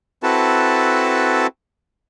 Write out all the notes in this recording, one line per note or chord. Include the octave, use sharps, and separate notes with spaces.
C4 E4 F#4 A4 B4 A5